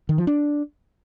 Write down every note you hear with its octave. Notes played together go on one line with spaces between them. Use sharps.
D#3
F3
D4